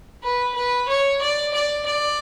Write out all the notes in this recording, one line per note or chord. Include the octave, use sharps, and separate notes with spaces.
B4
B4
C#5
D5
D5
D5